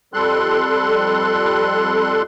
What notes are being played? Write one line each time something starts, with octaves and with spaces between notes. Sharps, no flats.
F2 G3 A4 C6 F#6